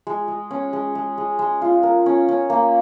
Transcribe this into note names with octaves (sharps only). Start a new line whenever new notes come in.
G#3
G#3
C#4
G#3
G#3
G#3
G#3
F4
A#4
C#4
C#4
A#3